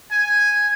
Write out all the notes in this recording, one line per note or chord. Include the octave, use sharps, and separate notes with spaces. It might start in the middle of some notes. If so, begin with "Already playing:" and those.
G#5